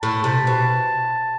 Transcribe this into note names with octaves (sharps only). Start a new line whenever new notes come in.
A2 A5
C3
B2